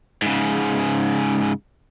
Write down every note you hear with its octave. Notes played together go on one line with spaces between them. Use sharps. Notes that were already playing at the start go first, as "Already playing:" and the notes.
G#2 C#3